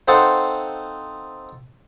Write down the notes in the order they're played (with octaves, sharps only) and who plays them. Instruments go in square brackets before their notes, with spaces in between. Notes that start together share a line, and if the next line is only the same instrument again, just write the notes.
[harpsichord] C4 D#4 A4 C5 F5 F#5